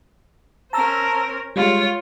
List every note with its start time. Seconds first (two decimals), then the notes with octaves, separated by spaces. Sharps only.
0.73 C#4 A#4 C5 A5 A#5 E6
1.56 G3 G#3 F4 C#5